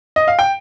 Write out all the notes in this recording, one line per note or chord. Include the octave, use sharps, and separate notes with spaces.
D#5
F5
G5